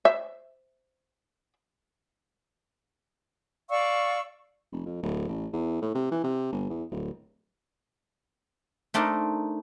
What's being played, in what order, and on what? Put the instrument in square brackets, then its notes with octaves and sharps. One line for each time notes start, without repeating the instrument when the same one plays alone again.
[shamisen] C5 E5
[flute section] D5 F5 C#6 E6
[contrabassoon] F1
F2
D1
A1
E2
A2
C3
E3
C3
G1
E2
D1
[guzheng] A3 C4 D4 D#4 A#4